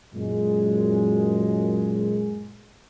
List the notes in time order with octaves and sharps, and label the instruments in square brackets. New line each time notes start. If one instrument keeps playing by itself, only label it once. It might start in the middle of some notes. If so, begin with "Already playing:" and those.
[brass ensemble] F#2 A#2 G#3